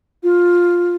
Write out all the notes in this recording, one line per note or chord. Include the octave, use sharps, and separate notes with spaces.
F4